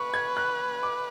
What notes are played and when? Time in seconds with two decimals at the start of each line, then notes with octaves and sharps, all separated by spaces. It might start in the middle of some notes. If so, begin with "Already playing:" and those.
Already playing: B4 C#6
0.14 G#6
0.37 F#6
0.83 D6